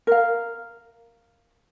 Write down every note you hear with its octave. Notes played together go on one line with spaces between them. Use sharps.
A#4 F5